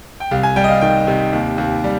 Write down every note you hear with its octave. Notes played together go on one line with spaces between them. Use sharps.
G5
C2 F5
G#5
G3 G5
D#5
F5
D#3 G5
C3
D#2
D#2
G3